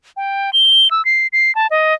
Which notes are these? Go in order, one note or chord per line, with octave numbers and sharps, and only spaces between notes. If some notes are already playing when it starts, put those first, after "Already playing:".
G5
G7
E6
C7
C7
A5
D#5